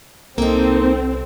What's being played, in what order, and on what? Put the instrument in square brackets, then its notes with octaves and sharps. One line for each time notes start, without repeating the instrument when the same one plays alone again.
[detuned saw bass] C2 [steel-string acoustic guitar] A#3 D#4 [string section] C4 [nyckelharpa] A4